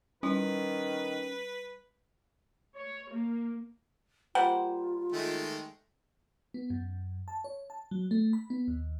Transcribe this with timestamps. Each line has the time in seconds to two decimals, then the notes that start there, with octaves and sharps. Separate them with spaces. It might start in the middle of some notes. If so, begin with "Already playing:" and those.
0.23 D#3 G3 C#4 E4 B4
2.75 C#5
3.09 A#3
4.35 G3 A#3 F4 C5 F#5
5.12 D#3 G#3 A3
6.54 B3
6.70 F#2
7.28 A5
7.44 C#5
7.70 A5
7.91 F#3
8.11 A3
8.33 B5
8.50 B3
8.68 D#2